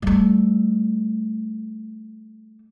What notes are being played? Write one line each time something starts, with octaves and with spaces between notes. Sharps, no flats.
G3 A3